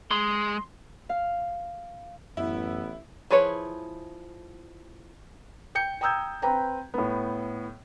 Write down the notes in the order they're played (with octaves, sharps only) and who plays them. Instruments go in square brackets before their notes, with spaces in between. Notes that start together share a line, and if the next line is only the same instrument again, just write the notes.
[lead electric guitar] G#3 [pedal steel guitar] C6
[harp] F5
[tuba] A1 [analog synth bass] F#2 [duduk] B3 [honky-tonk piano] E4
[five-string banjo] F3 E4 G#4 B4 C#5
[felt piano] G5 G6 C#7
G5 A#5 D#6 E6 G6 G#6
C4 B4 G5 A#5
A2 B3